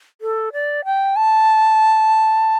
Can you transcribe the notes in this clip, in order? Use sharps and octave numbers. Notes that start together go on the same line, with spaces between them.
A4
D5
G5
A5